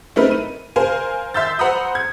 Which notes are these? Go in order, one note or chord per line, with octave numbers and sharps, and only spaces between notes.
A3 C4 D#4 E4 A#4 B4
D#7
A#4 C5 F5 G#5
E5 C6 E6 G6 A6
C5 F#5 A#5 B5 D#6 G6
G#6